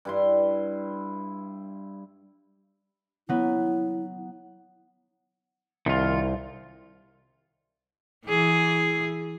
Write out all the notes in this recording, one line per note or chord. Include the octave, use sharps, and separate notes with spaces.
G2 E4 C6
F#3 B3 E4
C2 D#3 F4
E3 G#4